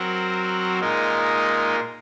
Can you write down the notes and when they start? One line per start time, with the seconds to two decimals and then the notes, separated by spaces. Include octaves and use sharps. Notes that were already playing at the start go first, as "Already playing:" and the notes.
Already playing: F#3 C4 F#4 A#4
0.79 A#2 G#3 D#4 A#4